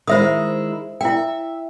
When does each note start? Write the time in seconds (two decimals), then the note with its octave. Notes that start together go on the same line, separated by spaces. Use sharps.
0.07 D#3 G#3 E4 C5 E5 D#6
1.01 E4 E5 G5